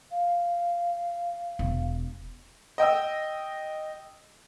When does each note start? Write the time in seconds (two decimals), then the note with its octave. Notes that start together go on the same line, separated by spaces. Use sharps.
0.11 F5
1.59 E1
2.78 D#5 G5 D#6 E6